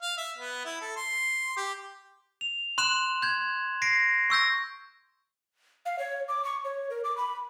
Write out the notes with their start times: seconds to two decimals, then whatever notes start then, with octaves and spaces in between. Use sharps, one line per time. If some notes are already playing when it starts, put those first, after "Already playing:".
0.02 F5
0.18 E5
0.38 B3
0.65 E4
0.81 A4
0.96 C6
1.57 G4
2.41 F7
2.78 C6 F#6 E7 F#7
3.22 G6 G#6
3.82 A#6 C7 D7
4.30 C#6 E6 G6 A#6
5.86 F5
5.99 C#5
6.28 D6
6.44 C#6
6.64 C#5
6.90 A#4
7.04 D6
7.17 B5